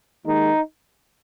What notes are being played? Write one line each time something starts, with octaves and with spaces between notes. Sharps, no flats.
D#2 D#3 G#3 D#4